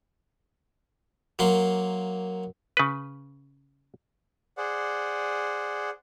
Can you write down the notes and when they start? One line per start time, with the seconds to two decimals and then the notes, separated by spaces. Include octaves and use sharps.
1.39 F#3 A#3 C6
2.77 C#3 B4
4.57 G#4 C5 D5 F#5